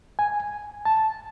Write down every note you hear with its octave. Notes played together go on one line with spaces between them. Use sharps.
G#5
A5